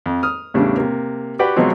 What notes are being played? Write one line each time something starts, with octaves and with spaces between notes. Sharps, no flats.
F2
D#6 F6
E2 A2 C#3 G3 D4
C3 A#3
F#4 G4 B4 D5 F#5 G5
B2 F3 F#3 G#3 C4